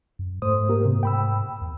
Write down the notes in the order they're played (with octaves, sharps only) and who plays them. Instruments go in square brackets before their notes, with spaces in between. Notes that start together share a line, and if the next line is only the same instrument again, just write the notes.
[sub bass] F#2
[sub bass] G#2 [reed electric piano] A3 C5 D#6
[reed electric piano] A#3 G4 A#4
C3
G5 B5 E6
[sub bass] E2